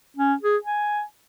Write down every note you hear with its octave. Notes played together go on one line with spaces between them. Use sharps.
C#4
G#4
G#5